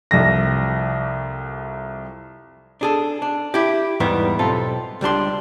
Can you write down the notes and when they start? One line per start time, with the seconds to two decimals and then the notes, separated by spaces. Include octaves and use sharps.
0.11 C2 F2 A#6
2.81 D4 G#4 A4
3.22 D4
3.54 E4 G4
4.00 E2 G#2 E3 G3 B3
4.39 B1 C4 F4 A4
5.01 C#2 G3 D4 C6